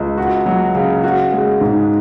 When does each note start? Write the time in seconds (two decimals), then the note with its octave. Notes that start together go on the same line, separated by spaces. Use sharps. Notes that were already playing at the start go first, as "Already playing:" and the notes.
Already playing: C#2
0.18 F#4
0.46 F#3
0.75 C#3
1.04 F#4
1.32 G#3
1.61 G#2